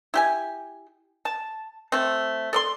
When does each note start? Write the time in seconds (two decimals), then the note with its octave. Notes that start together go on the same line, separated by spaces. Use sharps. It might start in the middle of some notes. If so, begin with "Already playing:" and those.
0.14 E4 G4 G#5
1.25 A5
1.92 A3 C4
2.53 A4 D5 C6